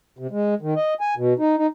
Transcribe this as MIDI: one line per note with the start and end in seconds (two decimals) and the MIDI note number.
0.19 0.27 48
0.31 0.54 56
0.62 0.74 51
0.76 0.94 75
1.01 1.14 80
1.17 1.33 47
1.39 1.55 63
1.57 1.67 63